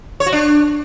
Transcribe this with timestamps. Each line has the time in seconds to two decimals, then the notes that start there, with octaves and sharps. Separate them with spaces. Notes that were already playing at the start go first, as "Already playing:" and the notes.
0.20 C#5
0.26 F#4
0.32 D4